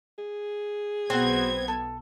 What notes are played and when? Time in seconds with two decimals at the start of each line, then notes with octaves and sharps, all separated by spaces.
0.18 G#4
1.10 B1 B3 C4 F#4 F#5 C6 G#6
1.68 A4